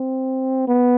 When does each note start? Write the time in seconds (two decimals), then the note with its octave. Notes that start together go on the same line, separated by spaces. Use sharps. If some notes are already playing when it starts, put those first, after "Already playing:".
Already playing: C4
0.68 B3